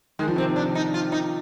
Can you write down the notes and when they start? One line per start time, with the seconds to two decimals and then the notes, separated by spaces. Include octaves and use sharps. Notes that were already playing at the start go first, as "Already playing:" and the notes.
0.19 D#3 G#3
0.28 F3
0.36 C3 D#3 C4
0.56 D4
0.75 D#4
0.94 F4
1.12 D#4